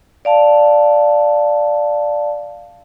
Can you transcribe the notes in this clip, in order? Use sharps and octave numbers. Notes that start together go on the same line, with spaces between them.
D5 F5 A5